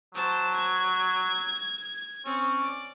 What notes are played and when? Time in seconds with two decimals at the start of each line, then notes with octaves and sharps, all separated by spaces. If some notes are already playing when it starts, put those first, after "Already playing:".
0.15 F#3 C5 A5
0.56 G#6
2.26 C4 C#4
2.58 D5 D6